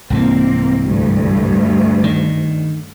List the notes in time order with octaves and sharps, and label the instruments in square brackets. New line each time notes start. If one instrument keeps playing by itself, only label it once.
[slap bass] C2 G#2 E3 [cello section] A#3 C4
[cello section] D2 G2
[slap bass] D#3